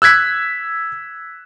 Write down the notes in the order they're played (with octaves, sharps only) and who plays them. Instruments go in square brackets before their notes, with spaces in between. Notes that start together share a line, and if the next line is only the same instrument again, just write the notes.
[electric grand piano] E6 F#6 G#6 B6